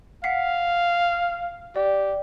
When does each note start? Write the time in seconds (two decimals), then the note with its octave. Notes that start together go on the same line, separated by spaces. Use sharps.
0.24 F5 F#5 B6 C7
1.76 G4 D5